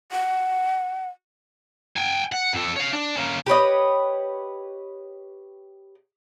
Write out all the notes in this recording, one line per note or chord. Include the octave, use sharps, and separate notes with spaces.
F#5
G5 G#5
F#5
F2 A4
C#5 F5
D4
A#3 C#4
G4 B4 C#5 D#5